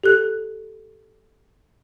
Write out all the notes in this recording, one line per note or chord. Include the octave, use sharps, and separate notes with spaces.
G4 A4 F#6